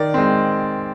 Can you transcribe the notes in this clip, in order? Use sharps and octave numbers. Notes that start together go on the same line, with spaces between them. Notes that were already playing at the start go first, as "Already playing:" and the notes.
Already playing: D#3 D5
G#3 C4